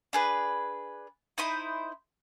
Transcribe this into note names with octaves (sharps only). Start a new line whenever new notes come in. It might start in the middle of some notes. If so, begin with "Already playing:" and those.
D4 G#4 B4
D#4 E4 C5 D#6